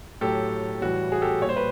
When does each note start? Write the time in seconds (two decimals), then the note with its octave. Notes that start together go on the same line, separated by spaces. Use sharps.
0.21 A2 F#3 G4 A4
0.82 A2 E3 G3 F#4
1.12 F#4 G#4
1.21 G4 A4
1.42 A#2 G3 C#5
1.49 C5
1.56 B4